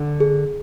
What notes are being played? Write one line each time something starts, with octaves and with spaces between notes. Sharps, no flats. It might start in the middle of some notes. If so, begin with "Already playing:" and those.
Already playing: D3
G#4